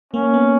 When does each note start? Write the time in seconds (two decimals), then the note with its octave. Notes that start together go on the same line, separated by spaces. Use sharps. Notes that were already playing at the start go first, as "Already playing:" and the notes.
0.14 A#3 C#4
0.34 B3